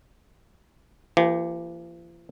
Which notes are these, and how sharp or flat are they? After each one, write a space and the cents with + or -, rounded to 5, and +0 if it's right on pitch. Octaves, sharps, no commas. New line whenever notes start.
F3 -45 A#3 +0 G4 +0